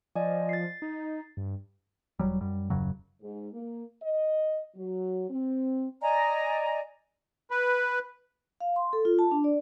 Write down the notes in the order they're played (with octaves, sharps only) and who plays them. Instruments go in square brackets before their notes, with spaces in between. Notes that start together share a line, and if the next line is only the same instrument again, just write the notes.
[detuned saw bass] F3 [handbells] D5 D#5 G#5
[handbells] A6 C7
[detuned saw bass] D#4
G2
[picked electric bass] E1 F#3 G3
F#2 G3
D#1 F#2 C#3 F#3
[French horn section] G#2
A#3
D#5
F#3
C4
[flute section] D5 D#5 G#5 A#5
[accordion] B4
[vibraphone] F5
C6
A4
F4
A5
D4
D5